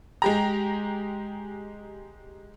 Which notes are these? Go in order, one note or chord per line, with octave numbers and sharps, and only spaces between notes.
G#3 G4 A#5